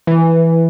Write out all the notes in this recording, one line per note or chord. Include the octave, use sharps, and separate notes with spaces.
E3